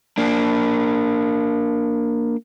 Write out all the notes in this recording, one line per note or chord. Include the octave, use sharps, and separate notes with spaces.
A#3 D4